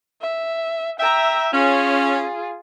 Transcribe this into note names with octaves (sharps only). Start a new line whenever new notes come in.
E5
E5 G5 A#5
C#4 F4 G#4